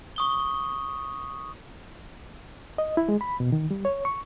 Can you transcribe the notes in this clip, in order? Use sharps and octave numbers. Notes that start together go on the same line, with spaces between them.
C#6 D#6 G7
D#5
E4
G#3
B5
B2
D#3
G3
C#5
C#6